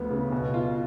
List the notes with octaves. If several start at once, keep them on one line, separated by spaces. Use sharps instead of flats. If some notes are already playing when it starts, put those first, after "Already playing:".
Already playing: D2 F3 B3
C#3
B2
F4